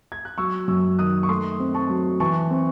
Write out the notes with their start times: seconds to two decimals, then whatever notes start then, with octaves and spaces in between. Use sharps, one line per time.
0.12 G#6
0.25 F#6
0.38 F#3 C#6 E6
0.68 F#2 C#6 E6
0.99 D#3 D#6 F#6
1.23 C#6
1.29 A3 C6 D#6
1.60 C4
1.75 A5 C#6
1.89 F#3
2.20 E3 A5 C#6
2.51 C4